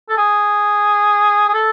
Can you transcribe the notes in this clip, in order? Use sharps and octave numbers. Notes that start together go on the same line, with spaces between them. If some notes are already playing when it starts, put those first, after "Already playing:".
A4
G#4
G#4
A4